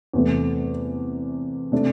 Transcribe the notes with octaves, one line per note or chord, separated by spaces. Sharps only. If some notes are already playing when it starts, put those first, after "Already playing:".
E2 C3 A3
C3 A3 D4